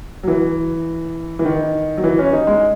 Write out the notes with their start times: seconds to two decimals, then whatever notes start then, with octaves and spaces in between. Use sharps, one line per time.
0.23 F#3
0.28 E3
1.39 E3
1.45 D#3
1.97 F#3
2.04 E3
2.19 C#4
2.33 D#4
2.47 G#3